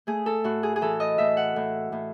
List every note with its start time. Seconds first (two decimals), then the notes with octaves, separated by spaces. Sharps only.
0.07 A3 G#4
0.26 A4
0.44 A2 F#4
0.63 G#4
0.76 G#4
0.81 E3 A4
1.00 D#5
1.18 A2 E5
1.37 F#5
1.56 A2
1.92 A2